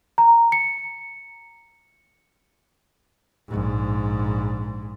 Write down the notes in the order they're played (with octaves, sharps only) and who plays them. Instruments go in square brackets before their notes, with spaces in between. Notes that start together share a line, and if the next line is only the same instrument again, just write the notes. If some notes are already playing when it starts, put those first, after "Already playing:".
[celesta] A#5
C#7
[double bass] A#1 G#2